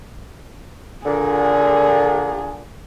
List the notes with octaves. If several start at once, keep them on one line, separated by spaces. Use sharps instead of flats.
A#2 D3 G#4